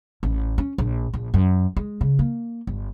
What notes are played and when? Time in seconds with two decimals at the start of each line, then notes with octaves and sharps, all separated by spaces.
0.23 A1
0.58 C#4
0.78 A#1
1.14 A#1
1.34 F#2
1.77 G#3
2.01 C#3
2.19 A#3
2.67 G1